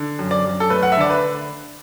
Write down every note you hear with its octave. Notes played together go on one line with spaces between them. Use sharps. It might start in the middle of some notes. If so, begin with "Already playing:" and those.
Already playing: D3
F#2
D5
F#2
A4
A3 B4
F#5
E5
D3 D5
B4